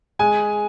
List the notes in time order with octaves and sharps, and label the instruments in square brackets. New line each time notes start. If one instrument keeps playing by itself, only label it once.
[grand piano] G#3 G#5